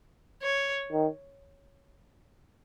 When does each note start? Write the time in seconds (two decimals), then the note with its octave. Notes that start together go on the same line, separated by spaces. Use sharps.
0.42 C#5
0.92 D#3